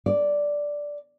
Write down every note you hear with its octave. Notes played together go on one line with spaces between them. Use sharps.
D5